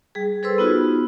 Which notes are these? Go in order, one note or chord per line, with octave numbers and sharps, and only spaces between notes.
G3 G#4
G#4 A4 B4 C5 C6 E6
B3 D#4 F4 F#4